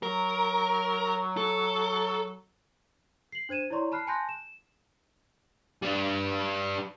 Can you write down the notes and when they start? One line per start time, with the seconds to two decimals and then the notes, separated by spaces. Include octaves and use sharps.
0.03 F#3 A#4
1.37 A4
3.32 C7 F#7
3.49 D4 C5 G#6 D#7 E7
3.70 E4 C#5 D5 A#5 C6 C#6
3.92 A5 B5 F6 F#6 C7
4.07 G#5 A5 C6 F#6 G6 A#6
4.29 E7
5.82 G3 D4